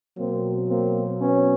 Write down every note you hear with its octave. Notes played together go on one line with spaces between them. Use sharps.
B2 F#3 A#3 C4
A#3 C4
B3 C#4